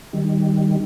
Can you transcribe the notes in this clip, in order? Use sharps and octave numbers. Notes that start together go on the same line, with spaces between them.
D#3 G3